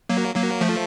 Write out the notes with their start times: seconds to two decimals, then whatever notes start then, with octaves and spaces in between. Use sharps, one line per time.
0.09 F#3 A#3
0.36 F#3 A#3
0.61 F3 A3